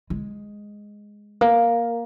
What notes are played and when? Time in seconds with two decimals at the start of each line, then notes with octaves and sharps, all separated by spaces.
0.10 G#3
1.41 A#3